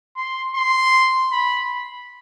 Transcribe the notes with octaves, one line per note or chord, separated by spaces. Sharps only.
C6
C6
B5